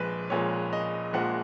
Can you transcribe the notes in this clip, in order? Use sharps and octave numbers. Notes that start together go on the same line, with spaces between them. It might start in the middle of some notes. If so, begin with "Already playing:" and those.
Already playing: A#1 A#2 F3 G#3 B4
A#1 A#2 F3 G#3 C#5
D#5
A#1 A#2 F3 G#3 F#5